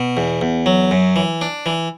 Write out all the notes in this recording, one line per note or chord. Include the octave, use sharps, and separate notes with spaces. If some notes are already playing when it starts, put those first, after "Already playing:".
Already playing: B2
E2
E2
F#3
F#2
E3
D4
E3